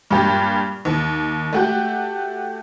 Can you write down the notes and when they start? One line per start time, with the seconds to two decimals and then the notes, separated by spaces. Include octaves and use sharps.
0.11 G2 A#2 G4
0.85 D#2
1.53 A3 F#4 G4